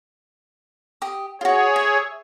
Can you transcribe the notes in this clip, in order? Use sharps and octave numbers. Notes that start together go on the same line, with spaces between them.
G4 D#6
F4 F#4 G#4 C#5
E5